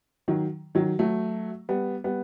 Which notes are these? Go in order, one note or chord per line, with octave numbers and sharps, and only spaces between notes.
D#3 F#3
D#3 F#3
F#3 A3
G3 B3
G3 B3